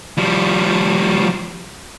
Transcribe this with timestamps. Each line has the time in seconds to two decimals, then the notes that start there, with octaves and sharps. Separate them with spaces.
0.17 F3 G3